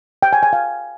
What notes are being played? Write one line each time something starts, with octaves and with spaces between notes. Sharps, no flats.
G5
G#5
G#5
F5